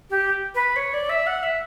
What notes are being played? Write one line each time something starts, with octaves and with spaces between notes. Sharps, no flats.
G4
B4
C#5
D5
E5
F#5
E5